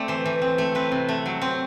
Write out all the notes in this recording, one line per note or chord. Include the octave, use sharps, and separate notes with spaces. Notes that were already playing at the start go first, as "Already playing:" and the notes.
Already playing: A3 C4 D5
E3 C5
E3
C4
A3
C4 B4
C3
A3
F#3
C4